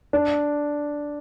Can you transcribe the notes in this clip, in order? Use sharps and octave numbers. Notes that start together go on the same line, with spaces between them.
D4